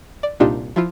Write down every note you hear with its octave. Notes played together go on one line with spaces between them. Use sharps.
D5
C2 A#2 D4 D#4 F4 G4
F3 E4 F4